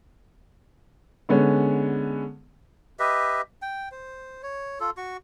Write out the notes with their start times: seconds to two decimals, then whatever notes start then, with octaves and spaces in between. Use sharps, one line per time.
1.29 D3 G#3 B3 C#4
2.99 G4 B4 D#5 E5
3.62 G5
3.92 C5
4.43 C#5
4.80 F4 A4
4.97 F#4 C#6